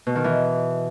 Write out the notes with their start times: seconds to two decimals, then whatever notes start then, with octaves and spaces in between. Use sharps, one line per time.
0.07 B2
0.15 D#3
0.24 E3